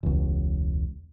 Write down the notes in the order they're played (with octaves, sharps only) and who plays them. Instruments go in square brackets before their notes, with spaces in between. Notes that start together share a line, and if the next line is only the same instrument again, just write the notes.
[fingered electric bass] E1 C#2